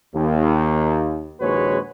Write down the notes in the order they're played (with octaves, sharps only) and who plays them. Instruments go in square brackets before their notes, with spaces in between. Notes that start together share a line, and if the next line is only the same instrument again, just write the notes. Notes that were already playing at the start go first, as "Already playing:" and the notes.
[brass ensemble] D#2
A#1 D#2 G#3 F#4 B4 C#5